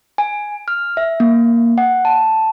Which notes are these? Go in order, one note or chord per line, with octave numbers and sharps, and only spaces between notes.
G#5
F6
E5
A#3
F#5
A5